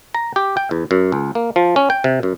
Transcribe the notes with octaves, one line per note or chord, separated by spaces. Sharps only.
A#5
G4
G5
E2
F#2
C#2
A#3
F3
C#4
G5
C3
F#2